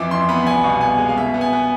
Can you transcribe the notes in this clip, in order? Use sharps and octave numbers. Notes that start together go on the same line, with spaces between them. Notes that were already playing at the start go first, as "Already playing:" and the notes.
Already playing: F2 E3 F3 D6
F2 C6
B3 B5
C2 G#5
B2 F5
B3 G#5
G#3
F5
B2 E5
B3
G#5
B3